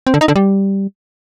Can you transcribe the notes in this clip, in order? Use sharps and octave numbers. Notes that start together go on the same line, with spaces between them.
C4
D3
D#4
D3
G3